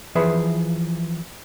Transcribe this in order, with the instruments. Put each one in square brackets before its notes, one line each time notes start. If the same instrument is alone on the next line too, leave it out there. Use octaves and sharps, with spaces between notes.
[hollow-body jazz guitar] E3 F3 G#4 B4 E5